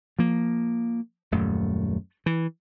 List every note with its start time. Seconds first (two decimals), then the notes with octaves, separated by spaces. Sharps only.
0.19 F3 A#3
1.31 D#1 F#2 A3
2.26 E3